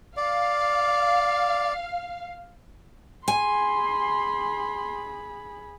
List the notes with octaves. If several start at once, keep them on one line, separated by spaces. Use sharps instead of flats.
D5 F5
G#4 G#5 B5 C6